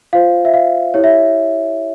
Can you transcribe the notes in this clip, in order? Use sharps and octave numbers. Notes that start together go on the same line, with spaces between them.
F4 C5 F5
E5
F5
E4 G4 C#5
E5